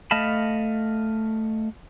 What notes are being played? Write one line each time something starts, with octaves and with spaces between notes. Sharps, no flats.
A3 D#5 F5 A5 B5